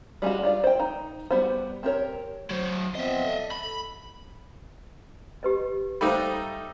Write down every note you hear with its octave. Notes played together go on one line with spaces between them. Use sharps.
G3 G#3 F4 F#4
D4 F4 D5
C5 G5
D#4
G3 B3 F#4 C5
C4 G4 A#4 C#5
F#3 C5
F3 B3 C4 D#5 E5
A4
B5
G4 B4 D#5
G3 A3 D#4 C5 F5 B5